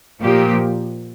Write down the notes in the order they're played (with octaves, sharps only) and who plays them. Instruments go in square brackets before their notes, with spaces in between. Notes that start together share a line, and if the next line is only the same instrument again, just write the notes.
[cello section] A#2 F3 A#3 G4